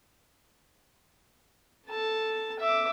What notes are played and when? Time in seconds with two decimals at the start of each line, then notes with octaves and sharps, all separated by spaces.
1.88 A4 A5
2.59 E5 D6